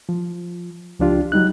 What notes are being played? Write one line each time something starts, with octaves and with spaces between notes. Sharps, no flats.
F3
C#2 F3 D4 F4 G4
F#3 G3 D#4 F#6